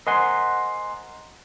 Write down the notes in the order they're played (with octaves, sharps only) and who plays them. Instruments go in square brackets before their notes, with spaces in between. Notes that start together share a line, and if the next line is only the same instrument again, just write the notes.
[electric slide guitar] A#4 C5 F#5 [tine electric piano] D#5 G#5 C6